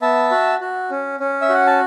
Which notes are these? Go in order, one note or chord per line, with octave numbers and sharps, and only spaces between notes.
B3 E5 A5
F#4
F#4
C#4
C#4
E5
F#4 F#5
A5